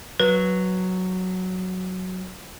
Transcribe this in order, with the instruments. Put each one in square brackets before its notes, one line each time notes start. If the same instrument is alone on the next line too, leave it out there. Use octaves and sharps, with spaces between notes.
[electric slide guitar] F#3 [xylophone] B4